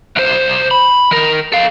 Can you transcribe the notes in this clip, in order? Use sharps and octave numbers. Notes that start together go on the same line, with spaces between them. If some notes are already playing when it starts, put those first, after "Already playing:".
C2 C5
B5
D#3 A#4
A4 F5